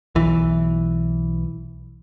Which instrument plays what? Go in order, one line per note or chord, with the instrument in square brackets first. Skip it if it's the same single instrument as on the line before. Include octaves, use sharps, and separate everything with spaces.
[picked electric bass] B1 E3